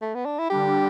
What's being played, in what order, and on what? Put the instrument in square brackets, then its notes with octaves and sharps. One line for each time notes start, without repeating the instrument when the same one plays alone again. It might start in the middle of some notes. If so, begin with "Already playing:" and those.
[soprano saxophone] A3
B3
D4
E4
[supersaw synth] D3 G3 D4 [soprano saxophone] G4